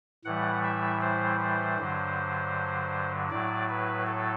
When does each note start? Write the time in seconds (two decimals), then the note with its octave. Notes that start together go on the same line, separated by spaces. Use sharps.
0.25 A2 E3 G3 F#5
0.64 E5
1.01 C5
1.40 C5
1.77 G2 D3 F#3
3.30 A2 F#3 D5
3.69 B4
4.06 A4